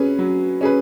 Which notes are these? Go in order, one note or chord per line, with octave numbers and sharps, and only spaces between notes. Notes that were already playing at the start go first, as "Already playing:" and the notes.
Already playing: F#3 C#4 G#4 B4
F#3
C#4 G#4 B4